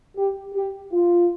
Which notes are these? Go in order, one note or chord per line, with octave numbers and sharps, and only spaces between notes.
G4
G4
F4